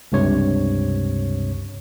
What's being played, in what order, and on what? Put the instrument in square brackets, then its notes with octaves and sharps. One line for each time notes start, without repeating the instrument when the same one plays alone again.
[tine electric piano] C#2 G2 C3 C#5